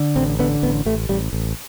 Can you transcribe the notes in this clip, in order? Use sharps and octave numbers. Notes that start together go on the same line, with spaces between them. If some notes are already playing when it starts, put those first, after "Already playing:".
Already playing: D3
A1 C4
D3 B3
A1 B3
A1 A3
A1 G3
A1